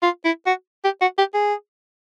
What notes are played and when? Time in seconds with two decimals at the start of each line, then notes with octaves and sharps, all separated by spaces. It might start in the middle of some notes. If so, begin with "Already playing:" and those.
0.03 F4
0.24 E4
0.46 F#4
0.84 G4
1.01 F#4
1.18 G4
1.34 G#4